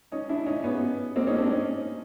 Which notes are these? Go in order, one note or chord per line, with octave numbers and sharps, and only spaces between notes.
C#4 D#4
D4 E4
C#4 D#4
B3 C#4
A#3 C4
C#4 D#4
C4 D4
C#4 D#4